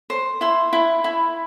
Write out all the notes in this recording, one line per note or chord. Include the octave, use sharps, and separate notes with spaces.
C5
E4 C6
E4
E4